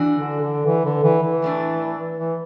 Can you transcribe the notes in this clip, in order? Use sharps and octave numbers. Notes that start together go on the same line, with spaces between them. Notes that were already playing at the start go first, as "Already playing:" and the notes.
Already playing: E3 D4 F#4
D3
D3
E3
D3
E3
E3
A2 A3 D4
E3